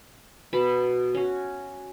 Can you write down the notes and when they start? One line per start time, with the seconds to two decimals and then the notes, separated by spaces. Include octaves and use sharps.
0.53 B2 A5 B5
1.15 C#4 F#4